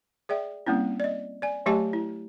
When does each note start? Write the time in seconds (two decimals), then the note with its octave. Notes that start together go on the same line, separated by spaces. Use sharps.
0.29 G#4 D5 E5 G5
0.67 G3 A#3 C4 C#4 E4
1.00 D5 D#5
1.42 D5 G#5
1.66 F#3 A3 G4 D#5 G#5 A5
1.93 E4